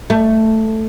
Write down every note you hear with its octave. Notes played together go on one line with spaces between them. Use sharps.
A3